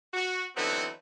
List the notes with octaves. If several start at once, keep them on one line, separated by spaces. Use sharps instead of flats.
F#4
D3 E3 F#3 B3 C4 D#4